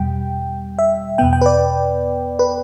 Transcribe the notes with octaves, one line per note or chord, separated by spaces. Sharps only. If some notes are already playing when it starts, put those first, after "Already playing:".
Already playing: E2 B2 G3 G5
E5
E2 B2 B3 G5
G5
B4
D5
B4